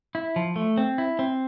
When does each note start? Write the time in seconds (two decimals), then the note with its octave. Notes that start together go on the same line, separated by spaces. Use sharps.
0.15 E4
0.36 F3
0.56 A3
0.77 C4
0.98 E4
1.19 C4